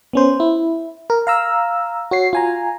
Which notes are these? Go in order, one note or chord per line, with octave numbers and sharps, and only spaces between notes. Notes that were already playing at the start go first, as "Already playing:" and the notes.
B3 C#4 C5
E4
A#4
F5 A#5 E6
F#4 C#5 C7
F4 G#5 A#5